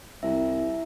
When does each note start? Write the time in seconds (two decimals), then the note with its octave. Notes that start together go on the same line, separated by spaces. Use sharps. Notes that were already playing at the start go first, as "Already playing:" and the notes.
0.23 C2 E4 E5